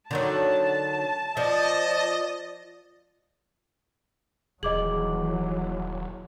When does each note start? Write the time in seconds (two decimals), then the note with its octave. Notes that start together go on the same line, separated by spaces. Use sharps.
0.11 D3 D#3 F#3 A5
1.37 F3 D5 D#5
4.63 D#1 E3 F#3 G#4 D#5 D6 F#7